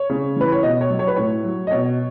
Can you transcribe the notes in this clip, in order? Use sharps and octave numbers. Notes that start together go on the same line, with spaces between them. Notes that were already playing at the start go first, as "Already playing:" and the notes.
Already playing: C#5
C#3
E3 B4
C#5
B2 D#5
C#5
F#3
C#5
B4
A2 C#5
F#3
D#5
B2 C#5